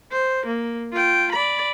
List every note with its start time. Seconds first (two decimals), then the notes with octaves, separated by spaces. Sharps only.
0.12 C5
0.46 A#3
0.93 F4 G5
1.32 D5 B5